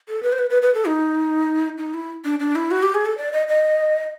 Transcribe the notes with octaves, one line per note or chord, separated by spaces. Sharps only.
A4
B4
C5
B4
B4
B4
A4
D#4
D#4
E4
D4
D4
E4
F#4
G4
G#4
A4
D5
D#5
D#5